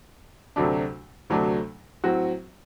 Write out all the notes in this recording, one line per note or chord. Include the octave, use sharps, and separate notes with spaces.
D2 C3 F#3 A3 D4
D2 C3 F#3 A3 D4
A2 F#3 C4 F#4